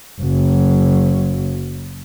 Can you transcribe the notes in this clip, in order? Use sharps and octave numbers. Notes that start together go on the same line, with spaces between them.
F#1 F#3